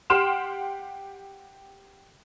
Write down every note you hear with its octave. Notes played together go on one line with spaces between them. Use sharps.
G4 F#5 G5 C6 F6 E7